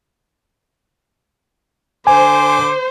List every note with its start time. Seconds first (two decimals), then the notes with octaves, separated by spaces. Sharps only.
2.07 D3 C5 G#5 D6